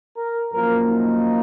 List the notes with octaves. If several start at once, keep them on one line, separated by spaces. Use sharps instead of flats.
A#4
F#2 F3 A#3 A#4
D#4